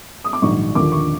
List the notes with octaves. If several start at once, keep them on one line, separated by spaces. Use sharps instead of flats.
D#6
D6
A#1 G#2 D#3 F#3 C#6
D#2 D3 F3 D6
C#6